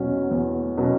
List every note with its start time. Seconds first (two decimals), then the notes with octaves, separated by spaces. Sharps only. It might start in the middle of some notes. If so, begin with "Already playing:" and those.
Already playing: E2 B2 F#3 C#4
0.31 E2
0.77 B2 F#3 C#4